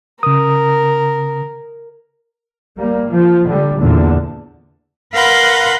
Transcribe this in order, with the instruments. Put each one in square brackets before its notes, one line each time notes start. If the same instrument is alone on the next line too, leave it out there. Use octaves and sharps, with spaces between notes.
[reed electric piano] C#3 D#6 [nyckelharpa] A#4
[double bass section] G3 A#3
F3
D3 G3
E2 A#2 D3
[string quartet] A#4 B4 F5 F#5 B5 C6